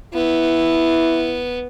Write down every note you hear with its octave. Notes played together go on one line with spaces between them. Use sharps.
B3 E4